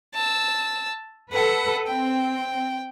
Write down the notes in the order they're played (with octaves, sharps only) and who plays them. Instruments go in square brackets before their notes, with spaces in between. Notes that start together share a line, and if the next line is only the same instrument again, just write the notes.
[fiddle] A5 E6
[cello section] A4 B4 [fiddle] F#5
[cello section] C4 [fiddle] G5